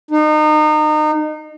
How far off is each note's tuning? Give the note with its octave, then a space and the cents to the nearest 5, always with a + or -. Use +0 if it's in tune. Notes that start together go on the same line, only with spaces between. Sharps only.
D#4 -30